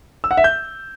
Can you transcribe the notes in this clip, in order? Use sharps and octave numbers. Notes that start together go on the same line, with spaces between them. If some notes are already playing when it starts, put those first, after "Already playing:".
E6
F#5
E5
G6